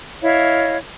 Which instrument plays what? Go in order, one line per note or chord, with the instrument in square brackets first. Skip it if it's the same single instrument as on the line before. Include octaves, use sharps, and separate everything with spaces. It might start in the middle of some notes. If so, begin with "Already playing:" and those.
[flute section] E4 C#5 D#5 F5